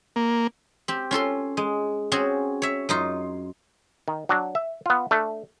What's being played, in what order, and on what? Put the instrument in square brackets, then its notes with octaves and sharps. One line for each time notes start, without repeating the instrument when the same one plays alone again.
[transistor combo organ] A#3
[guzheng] C4 G4
C#4 F4 A4 C6
G#3
C4 C#4 F#4 G#4
C#5 E5
F#2 D#4 F4
[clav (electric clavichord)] D#3
F#3 D4 F#4
E5
B3 F4
A3 D4